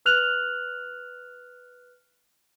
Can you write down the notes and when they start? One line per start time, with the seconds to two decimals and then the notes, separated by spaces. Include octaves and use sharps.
0.05 B4 F6 F#6 F7 F#7